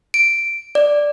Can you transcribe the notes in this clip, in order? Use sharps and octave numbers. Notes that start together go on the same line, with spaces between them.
D7
D5